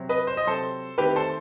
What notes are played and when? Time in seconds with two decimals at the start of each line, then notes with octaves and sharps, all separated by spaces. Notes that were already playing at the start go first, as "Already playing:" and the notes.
Already playing: C3 F#3 C4
0.09 B4 D#5
0.27 C5
0.37 D#5
0.45 C3 F#3 C4 A4 C5
0.98 D#3 A3 C4 G4 B4
1.16 A4 C5